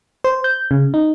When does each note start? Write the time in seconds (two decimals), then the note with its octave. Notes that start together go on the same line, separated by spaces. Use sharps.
0.24 C5
0.44 G6
0.71 C#3
0.94 D#4